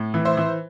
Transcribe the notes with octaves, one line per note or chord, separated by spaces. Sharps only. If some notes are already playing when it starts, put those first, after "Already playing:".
Already playing: A2
E3
C5 E5
E3